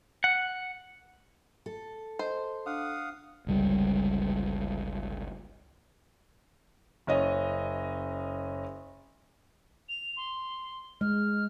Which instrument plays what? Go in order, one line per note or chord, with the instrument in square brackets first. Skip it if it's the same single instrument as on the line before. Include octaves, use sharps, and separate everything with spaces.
[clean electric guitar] F#5
[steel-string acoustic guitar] A4
[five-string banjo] C5 [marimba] D#5
[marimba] D4 [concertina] F5 F#5 D#6
[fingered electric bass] G1 C#2 G3
[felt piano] F#1 C#4 D#5
[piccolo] F7
C6
[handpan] G#3 [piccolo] F6